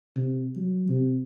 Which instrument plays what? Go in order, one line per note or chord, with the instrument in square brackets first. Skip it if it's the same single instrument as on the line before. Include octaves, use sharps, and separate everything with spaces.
[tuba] C3
F#3
C3